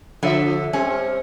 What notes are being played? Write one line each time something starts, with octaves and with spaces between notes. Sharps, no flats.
D3 F3 E5
G3 C4 C#4